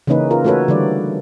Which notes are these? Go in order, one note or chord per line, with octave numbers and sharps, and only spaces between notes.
C#3 E3 A#3 C#4 D#4 B4
F4 A#4
A3 D#4 F#4 A4 B4 C#5
D3 E3 G3 D5